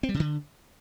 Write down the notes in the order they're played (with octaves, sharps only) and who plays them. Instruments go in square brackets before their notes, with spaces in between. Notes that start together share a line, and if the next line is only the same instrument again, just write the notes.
[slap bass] C4
G3
C3
D3